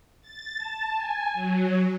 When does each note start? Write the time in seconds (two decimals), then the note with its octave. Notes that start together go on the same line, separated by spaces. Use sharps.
0.22 A6
0.58 A5
0.96 G#5
1.34 F#3